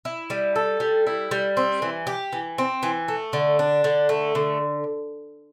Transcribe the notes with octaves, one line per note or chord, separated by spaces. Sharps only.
E4
G3
A4
G3
E4
G3
C4
E3
G4
E3
C4
E3
A3
D3
D4
D3
A3
D3